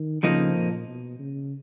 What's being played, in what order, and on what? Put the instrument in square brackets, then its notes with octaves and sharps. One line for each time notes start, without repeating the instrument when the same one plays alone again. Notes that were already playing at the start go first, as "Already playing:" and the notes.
Already playing: [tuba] D#3
[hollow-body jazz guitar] F2 F3 A#3 D#4 [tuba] C#3
[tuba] A#2
B2
C#3